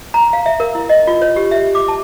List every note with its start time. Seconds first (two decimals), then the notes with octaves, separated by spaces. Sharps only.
0.14 A#5
0.33 F5
0.46 E5
0.60 A#4
0.75 E4
0.89 D#5
1.07 F4
1.22 C#5
1.36 G4
1.51 E5
1.75 D6
1.88 A5